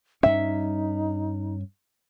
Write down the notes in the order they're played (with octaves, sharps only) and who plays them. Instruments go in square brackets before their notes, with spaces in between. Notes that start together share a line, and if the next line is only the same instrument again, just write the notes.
[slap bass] G2 C#4 [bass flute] D#4 [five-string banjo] E5